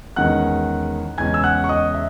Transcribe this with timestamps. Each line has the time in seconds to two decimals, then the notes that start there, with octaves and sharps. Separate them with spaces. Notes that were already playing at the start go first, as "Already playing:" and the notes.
0.16 E2 D#3 G#3 C#4 F#5 F#6
1.18 E2 C#3 G#3 C#4 G#5 G#6
1.34 E6
1.44 F#5 F#6
1.64 C#6
1.69 D#5 D#6
1.94 E5